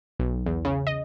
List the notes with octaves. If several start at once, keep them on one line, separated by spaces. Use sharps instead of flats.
B1
E2
C#3
D#5